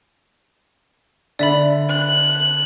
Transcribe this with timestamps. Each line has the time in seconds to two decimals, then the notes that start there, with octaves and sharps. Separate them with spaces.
1.39 D3 D5 E5 B5
1.89 F#6